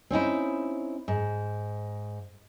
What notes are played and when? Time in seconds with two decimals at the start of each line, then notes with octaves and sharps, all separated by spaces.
0.10 C4 C#4 D#4 E4
1.08 G#2